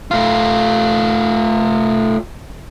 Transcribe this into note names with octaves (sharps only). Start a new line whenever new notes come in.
A3 F4